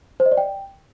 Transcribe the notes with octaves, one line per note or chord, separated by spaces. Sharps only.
C5
D#5
D5
G5